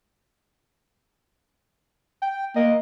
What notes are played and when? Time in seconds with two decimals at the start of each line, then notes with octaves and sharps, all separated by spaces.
2.22 G5
2.56 A#3 D#5